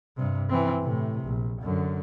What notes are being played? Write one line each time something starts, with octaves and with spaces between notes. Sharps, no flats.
G2 C3
E3 C4
A2 C3
A#1
F#2 D3